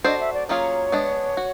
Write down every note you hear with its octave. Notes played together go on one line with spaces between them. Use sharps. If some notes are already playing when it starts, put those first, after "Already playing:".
D4 F#4 A4 C5 D#5
E5
D5
F#3 A#3 C#4 F4 G#4 C#5
G#3 B3 D4
F#4